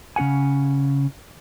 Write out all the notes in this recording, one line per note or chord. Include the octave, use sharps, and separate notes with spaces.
C#3 C#4 G#4 F#5 G#5